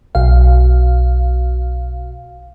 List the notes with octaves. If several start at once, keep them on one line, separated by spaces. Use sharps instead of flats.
B1 F5